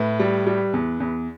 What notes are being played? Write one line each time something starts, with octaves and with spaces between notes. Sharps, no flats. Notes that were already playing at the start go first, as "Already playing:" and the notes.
Already playing: A2 B4 E5
G3
G3
E2
E2